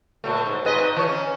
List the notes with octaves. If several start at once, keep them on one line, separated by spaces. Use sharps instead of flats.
A#2 F#3 A3
G#2
G#2 B4 D#5
D#4
E3 C#5
C#4